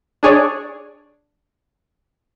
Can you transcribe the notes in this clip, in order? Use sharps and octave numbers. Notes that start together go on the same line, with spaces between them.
D4 G#4 C#5 D5